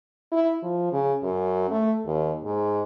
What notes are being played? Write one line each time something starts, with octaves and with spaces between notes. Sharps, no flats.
E4
F3
C#3
F#2
A3
D#2
G#2